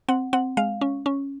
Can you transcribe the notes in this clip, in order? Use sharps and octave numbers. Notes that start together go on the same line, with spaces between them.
C4 F#5
C4 F#5
G#3 F5
C#4
C#4